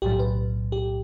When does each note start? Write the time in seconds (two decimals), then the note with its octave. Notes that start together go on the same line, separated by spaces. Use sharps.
0.02 B1 A2 F#3 G4
0.19 B4
0.72 G4